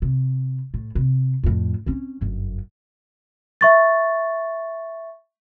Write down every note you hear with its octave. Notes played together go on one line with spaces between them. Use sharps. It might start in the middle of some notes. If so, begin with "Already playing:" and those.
C3
A2
C3
F2 A2
C4 C#4
G1 F#2
E5 C#6 A6